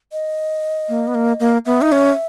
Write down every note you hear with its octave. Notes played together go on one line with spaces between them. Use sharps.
D#5
A#3
B3
A#3
A#3
B3 E5
D#4
C#4